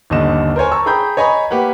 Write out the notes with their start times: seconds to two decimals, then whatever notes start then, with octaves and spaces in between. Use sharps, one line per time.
0.10 G1 D#2 D3 D#5 E7
0.56 A#4 C5 C#5 G#5
0.72 A5 A#5 C#6 E6
0.86 G#4 G5 A#5 B5 G6
1.17 C#5 D#5 G#5 A#5 B5
1.51 A#3 G4 B4 F#5